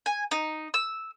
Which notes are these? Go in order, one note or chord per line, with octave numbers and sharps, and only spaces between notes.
G#5
D#4
E6